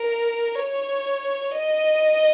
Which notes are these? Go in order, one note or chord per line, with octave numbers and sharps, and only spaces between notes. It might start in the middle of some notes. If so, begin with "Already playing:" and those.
Already playing: A#4
C#5
D#5